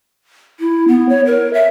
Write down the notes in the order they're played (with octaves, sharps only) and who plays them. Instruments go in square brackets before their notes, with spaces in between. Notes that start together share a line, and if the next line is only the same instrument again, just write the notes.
[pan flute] E4
B3
C#5
A#4
E5